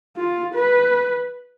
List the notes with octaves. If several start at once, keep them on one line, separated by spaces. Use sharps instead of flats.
F4
B4